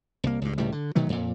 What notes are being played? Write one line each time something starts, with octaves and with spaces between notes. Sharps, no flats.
C2 A#3
C#2 G2
C#2 A2 C3 G3
D3
B2 D#3 F#3 A3
F2 A#2